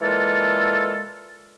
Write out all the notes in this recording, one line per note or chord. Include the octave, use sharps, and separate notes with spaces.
A#2 E3 G#3 F4 A4